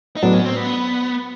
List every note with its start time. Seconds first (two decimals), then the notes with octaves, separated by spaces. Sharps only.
0.16 D#4
0.22 A2 F#3 B3 D4
0.34 C#4
0.45 C4
0.56 B3